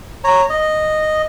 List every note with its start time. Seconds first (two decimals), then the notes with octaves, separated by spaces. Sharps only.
0.24 C#5 A#5
0.50 D#5